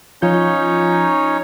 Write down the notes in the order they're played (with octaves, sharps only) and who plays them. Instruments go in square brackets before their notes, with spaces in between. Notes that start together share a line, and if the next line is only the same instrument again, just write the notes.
[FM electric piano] F3 F4 G6 [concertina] C#4 D#4 C#5